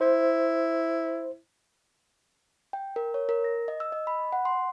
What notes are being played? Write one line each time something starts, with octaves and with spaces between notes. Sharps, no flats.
E4 C5
G5
A#4
C#5
A#4
A#6
D#5
E6
D#5
B5
F#5
C6